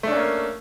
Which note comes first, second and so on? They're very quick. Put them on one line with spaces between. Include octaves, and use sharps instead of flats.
A3 D4 C#4 A#3